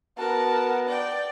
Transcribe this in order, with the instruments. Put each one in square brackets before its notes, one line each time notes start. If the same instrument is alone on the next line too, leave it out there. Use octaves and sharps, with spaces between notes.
[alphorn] B3 [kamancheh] F#4 A#4 [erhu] A5
[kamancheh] D5 [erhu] G5